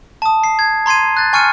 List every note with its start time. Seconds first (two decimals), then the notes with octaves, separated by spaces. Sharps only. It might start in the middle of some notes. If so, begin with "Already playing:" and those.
0.22 A5 D#6
0.44 C7
0.59 G#6
0.86 A#5 C6 G#6 C7 D#7
1.17 F#6 A6
1.33 G#5 C#6 F6 C#7 D#7